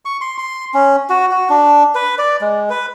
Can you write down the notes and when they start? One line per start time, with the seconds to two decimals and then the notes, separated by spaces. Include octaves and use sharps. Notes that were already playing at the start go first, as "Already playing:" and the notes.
0.05 C#6
0.21 C6
0.38 C6
0.74 C#4
1.10 F#4
1.31 F#4
1.49 D4
1.95 B4
2.18 D5
2.41 G#3
2.70 B4